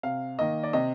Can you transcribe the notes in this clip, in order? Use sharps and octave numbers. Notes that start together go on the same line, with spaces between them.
C3 F5
D#3 A#3 D#5
D5
C3 D#5